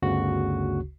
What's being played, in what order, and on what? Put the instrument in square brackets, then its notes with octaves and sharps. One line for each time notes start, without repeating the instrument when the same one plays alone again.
[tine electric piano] G1 D2 C#3 F#4